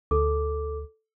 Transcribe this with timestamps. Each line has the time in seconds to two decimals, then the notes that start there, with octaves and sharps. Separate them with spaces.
0.11 D2 A4 D6